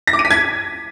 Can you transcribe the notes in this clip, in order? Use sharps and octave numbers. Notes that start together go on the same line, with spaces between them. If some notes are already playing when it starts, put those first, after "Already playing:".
A#6
D6
D#7
B6
G#6